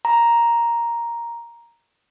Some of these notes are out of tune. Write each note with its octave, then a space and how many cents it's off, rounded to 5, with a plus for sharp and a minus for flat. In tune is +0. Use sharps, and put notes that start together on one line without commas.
A#5 +5